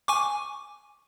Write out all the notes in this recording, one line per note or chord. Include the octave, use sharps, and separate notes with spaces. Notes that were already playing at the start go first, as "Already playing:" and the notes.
G#5 C#6 D6